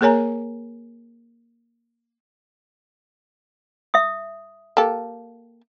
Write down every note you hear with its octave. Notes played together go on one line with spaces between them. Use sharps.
A#3 G#4 A#4 C#5 G#5 A#5
E5 D#6
A#3 G4 A4